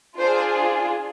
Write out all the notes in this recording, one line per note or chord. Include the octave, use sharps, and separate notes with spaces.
D4 F4 G#4 C5